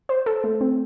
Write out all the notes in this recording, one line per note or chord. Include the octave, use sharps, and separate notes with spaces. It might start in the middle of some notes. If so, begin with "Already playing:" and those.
C5
A4
A3
C4